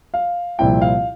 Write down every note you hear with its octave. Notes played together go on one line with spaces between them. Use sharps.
F5
C2 A#2 F3 C4 E4 G5
F5